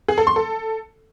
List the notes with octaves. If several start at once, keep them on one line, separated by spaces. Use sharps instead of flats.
G#4
A4
C6
A4